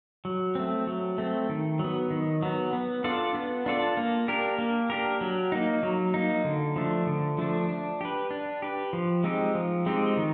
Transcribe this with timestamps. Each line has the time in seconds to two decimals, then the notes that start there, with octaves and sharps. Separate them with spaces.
0.25 F#3
0.55 A3 C4
0.87 F#3
1.18 A3 C4
1.49 D#3
1.79 F#3 B3
2.10 D#3
2.43 F#3 B3
2.73 B3
3.04 D4 F4 A4 D5
3.35 B3
3.66 D4 F4 A4 D5
3.97 A#3
4.28 D4 G4 A#4
4.59 A#3
4.90 D4 G4 A#4
5.21 F#3
5.52 A#3 D#4
5.83 F#3
6.14 A#3 D#4
6.44 D3
6.76 F3 A3 D4
7.07 D3
7.38 F3 A3 D4
7.69 D4
8.01 G4 B4
8.31 D4
8.62 G4 B4
8.93 F3
9.24 G#3 C4 D#4 G4
9.55 F3
9.86 G#3 C4 D#4 G4
10.17 D#3